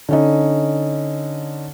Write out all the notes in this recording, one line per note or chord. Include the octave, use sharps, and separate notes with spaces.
D3 C#4 D#4